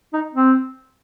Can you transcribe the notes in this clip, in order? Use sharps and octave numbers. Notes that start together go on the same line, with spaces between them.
D#4
C4